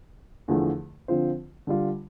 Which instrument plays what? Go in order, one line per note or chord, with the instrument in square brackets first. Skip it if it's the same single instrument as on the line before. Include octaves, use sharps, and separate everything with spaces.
[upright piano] E2 D3 F3 A3
D3 F3 C4 F4 C5
D3 G3 D4 F4